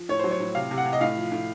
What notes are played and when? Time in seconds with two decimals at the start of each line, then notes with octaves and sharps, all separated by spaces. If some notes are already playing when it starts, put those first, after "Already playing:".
Already playing: F3
0.09 A2 C#5
0.19 F#3 C5
0.31 C#5
0.40 A2
0.55 C3 F5
0.71 C3
0.78 F#5
0.86 C3
0.93 D#5
1.01 A2 F5
1.16 F3
1.32 A2